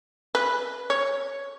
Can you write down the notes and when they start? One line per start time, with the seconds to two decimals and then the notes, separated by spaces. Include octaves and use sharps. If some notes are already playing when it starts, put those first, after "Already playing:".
0.35 B4
0.90 C#5